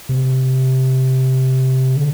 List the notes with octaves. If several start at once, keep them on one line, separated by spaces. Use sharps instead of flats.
C3
D3